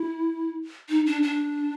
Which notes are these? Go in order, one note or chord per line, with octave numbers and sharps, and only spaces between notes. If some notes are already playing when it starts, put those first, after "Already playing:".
Already playing: E4
D#4
D4
D4